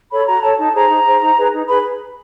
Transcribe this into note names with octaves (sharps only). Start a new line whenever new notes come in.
A4 C#5 B5
F#4 A#5
A4 C#5 A5
D#4 A5
G#4 C5 A#5
D#4
G#4 C5
D#4
G#4 B4
D#4
G#4 B4 B5